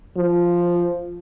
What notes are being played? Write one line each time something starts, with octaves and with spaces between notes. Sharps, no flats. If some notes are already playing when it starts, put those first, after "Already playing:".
F3